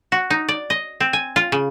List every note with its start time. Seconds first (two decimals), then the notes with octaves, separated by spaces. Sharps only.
0.12 F#4
0.30 D#4
0.49 D5
0.70 D#5
1.00 C4
1.13 G#5
1.36 F4
1.52 C#3